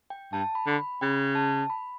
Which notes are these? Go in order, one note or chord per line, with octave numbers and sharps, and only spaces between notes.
G5
G2 A5
B5
D3
B5
C#3 G5
A5
B5